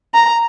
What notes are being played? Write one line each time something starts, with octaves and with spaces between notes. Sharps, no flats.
A#5